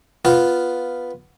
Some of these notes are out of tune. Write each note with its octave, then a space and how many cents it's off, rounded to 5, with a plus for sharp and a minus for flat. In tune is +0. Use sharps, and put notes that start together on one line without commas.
B3 +0 F4 +0